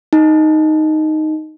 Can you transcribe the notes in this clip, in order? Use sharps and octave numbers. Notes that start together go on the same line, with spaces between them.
D#4